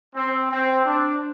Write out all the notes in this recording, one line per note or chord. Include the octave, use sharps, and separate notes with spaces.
C4
C4
D4